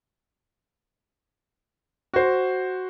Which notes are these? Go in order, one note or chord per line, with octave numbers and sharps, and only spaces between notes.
F#4 C5